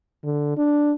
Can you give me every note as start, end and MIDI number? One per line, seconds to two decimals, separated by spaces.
0.24 0.53 50
0.57 0.92 62